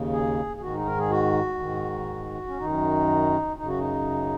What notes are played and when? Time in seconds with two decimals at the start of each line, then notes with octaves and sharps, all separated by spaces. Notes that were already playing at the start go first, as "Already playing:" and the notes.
Already playing: D#2 C#3
0.12 G#4
0.57 G#4
0.61 G#2 D#3 F#4
0.74 D#4
0.85 A#4
0.98 G#4
1.10 F#4
1.59 G#2 D#3
2.47 C#4
2.58 F#2 D#3 D#4
3.57 F#2 C#3 D#4
3.68 F#4
3.78 D#4